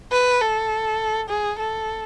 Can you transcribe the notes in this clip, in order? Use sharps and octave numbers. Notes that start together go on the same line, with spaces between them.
B4
A4
G#4
A4